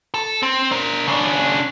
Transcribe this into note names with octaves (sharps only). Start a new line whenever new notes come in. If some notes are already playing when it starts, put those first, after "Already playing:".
A4
C4
D4 A#4
C#3 D4